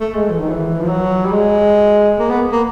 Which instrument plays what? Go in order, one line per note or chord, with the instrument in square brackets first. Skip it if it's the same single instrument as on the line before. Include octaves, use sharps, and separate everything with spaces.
[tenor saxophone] A3
G#3
E3
D#3
E3
F3
F#3
G3
G#3
A#3
B3
A#3